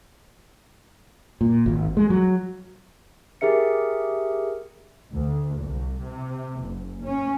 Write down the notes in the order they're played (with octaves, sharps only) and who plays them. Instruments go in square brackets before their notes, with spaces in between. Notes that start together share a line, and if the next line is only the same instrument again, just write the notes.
[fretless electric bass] A#2
G#1
G#3
F#3
[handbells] G4 G#4 A#4 E5 C#7
[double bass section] D2
C2
C3
F#1
C#4